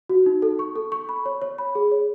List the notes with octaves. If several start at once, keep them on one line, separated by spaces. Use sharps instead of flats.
F#4
D#4
A4
C#6
A4
C#6
B5
C#5
C#5
B5
G#4
C#5